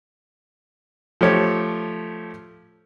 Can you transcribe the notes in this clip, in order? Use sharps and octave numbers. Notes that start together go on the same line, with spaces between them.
F3 A3 G4 C#5